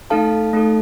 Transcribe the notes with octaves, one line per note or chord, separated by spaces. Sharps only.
A3 D#4 A4 F5 A5
A3 D#4 A4